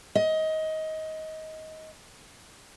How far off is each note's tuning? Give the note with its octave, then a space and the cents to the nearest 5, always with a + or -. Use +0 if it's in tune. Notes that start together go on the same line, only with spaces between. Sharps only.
D#5 +20